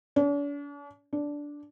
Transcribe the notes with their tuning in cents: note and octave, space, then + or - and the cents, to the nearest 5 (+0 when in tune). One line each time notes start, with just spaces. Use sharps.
D4 -45
D4 -10